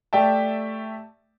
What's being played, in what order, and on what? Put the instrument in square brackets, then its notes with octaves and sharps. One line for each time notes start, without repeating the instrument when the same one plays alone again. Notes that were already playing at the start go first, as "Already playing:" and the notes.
[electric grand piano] A3 G4 D5 E5 G5 A5